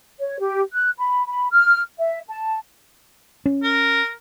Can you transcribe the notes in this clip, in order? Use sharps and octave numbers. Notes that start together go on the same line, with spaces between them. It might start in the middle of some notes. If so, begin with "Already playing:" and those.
C#5
G4
F#6
B5
B5
F6
E5
A5
C#4
A#4